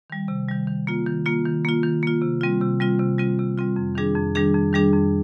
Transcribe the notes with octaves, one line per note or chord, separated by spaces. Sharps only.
D#3 G3
C3
D#3 G3
D#3
A#3 F4
D#3
A#3 F4
D#3
A#3 F4
D#3
A#3 F4
C3
G3 C4 F4
C3
G3 C4 F4
C3
G3 C4 F4
C3
G3 C4 F4
F2
D#3 G3 D4 G#4
F2
D#3 G3 D4 G#4
F2
D#3 G3 D4 G#4
F2